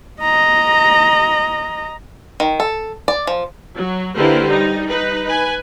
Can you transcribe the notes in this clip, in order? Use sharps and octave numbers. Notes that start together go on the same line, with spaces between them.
D#5 A#5
D#3
A4
D5
F3
F#3
D3 A#3 E4 G4 B4 C5
G3 D#4
D#4 B4
B4 G#5